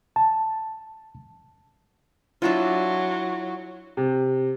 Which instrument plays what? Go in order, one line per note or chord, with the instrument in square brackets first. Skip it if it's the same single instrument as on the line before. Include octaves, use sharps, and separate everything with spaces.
[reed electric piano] A5
[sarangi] F#3 [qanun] D4 E4 F4
[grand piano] C3